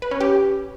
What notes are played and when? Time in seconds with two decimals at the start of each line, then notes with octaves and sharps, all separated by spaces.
0.02 B4
0.11 C#4
0.20 G4